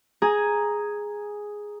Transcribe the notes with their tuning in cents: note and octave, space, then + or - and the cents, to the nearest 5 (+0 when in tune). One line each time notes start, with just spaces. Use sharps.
G#4 +0 A#5 +0